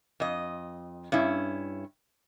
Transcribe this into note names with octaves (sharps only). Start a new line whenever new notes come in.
F2 D#5
G2 C#4 E4